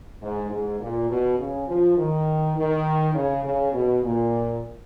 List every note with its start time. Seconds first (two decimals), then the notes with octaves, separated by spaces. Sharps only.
0.22 G#2
0.51 G#2
0.80 A#2
1.10 B2
1.39 C#3
1.68 F3
1.97 D#3
2.57 D#3
3.15 C#3
3.45 C#3
3.73 B2
4.03 A#2